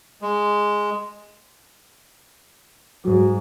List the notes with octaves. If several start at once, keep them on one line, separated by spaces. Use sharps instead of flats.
G#3
G#2 F#3